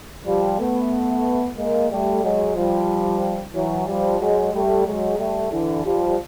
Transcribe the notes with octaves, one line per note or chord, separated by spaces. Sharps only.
F3 G3
A3 B3
G#3 A#3
G3 A3
F#3 G#3
F3 G3
E3 F#3
F3 G3
F#3 G#3
G3 A3
F#3 G#3
G3 A3
D3 E3
F3 G3